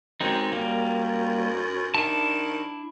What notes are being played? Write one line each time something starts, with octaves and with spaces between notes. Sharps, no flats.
F#2 G#3 C4 D#4
G3 A#3
D#3 D4 E4 A5